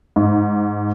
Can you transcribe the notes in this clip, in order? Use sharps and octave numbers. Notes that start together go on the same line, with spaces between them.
G#2